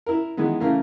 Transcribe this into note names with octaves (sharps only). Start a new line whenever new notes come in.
E4 A#4
D#3 E3 G#3 B3
C#3 E3 A3 A#3